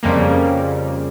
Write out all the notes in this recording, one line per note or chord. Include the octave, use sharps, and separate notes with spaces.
F2 C#3 G3 A#3